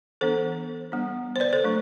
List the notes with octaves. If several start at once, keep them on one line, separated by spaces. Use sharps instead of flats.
E3 B3 D4 A4 C5
G3 B3 D4
C5
B4 D5
A4 C5
F#3 A3 D4